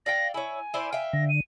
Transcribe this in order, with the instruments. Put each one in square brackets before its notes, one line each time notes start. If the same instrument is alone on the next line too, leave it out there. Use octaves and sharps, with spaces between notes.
[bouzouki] D5 F5 G5 [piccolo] A#6
[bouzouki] E4 C#5 [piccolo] G#5
[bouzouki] E4 C5 D5
E5 F5 G5
[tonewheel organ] D3 [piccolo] A#6
[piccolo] D#7